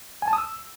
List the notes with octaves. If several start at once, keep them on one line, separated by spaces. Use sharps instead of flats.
G#5
A5
D#6
E6